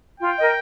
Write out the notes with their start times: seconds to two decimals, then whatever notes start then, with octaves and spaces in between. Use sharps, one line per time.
0.19 F4 G5
0.36 A#4 D#5